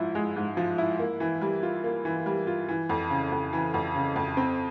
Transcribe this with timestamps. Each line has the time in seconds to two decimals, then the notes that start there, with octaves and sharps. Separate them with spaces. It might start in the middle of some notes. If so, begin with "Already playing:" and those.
Already playing: G#2 F3 E4
0.15 G#3
0.36 G#2
0.57 F3
0.78 E4
0.99 A#3
1.20 E3
1.41 G3
1.63 F4
1.84 A#3
2.05 E3
2.26 G3
2.47 F4
2.68 E3
2.89 F2
3.10 C#3
3.32 F2
3.53 E3
3.74 F2
3.95 C#3
4.16 F2
4.37 C4